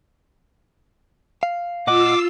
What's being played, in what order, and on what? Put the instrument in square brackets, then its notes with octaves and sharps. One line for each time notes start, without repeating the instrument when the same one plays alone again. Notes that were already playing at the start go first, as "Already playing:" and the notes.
[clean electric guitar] F5
[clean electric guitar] A#2 D#5 F#5 [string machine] F4 E6 C7 [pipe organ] D6